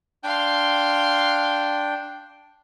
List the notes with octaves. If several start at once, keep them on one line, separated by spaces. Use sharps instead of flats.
D4 F5 G5 C6